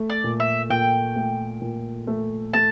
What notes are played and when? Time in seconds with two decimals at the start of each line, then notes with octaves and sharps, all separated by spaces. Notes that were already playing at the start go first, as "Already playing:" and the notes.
Already playing: A3
0.10 D5
0.24 A#2
0.40 E5
0.70 A#2 G5
1.16 A3
1.61 A#2
2.07 A3
2.54 A3 A5